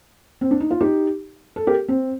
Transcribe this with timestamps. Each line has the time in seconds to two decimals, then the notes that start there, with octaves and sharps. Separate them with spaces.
0.41 C4
0.51 D4
0.60 D#4
0.71 F4
0.80 D#4 G4
1.56 A4
1.67 G4 A#4
1.88 C4